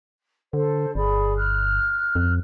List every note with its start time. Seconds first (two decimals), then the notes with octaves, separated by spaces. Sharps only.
0.53 D3 A4 C5
0.95 G1 G#4 D5 B5
1.36 F6 F#6
2.15 F2